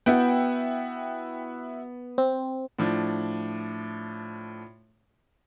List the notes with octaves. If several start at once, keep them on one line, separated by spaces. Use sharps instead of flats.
B3 E4 F#4 G5
C4
A2 F3 D4